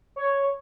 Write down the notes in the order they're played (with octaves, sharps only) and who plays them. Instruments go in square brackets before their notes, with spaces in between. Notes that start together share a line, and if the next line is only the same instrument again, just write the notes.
[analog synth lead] C#5